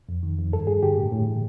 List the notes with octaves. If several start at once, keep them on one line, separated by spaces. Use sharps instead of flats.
F2
D#3
F2
G2 A4
G2 G#4
D3 G4
A2
A2
E3